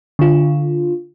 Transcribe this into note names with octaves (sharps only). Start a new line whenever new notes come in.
D3 F4